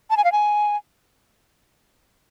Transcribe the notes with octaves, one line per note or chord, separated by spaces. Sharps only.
A5
G#5
F5
G#5